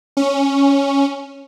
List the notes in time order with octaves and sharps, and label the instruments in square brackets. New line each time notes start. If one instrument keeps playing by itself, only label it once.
[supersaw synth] C#4